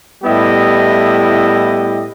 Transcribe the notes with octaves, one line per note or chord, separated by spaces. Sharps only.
A2 G3 B3 E4 G4 D#5